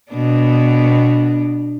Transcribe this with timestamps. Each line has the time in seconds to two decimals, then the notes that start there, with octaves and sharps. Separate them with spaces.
0.12 B2 B3 D4